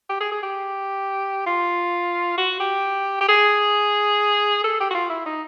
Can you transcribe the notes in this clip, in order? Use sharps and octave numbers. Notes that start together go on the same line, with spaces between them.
G4
G#4
G#4
G4
F4
F#4
G4
G4
G#4
A4
G4
F#4
F4
E4
D#4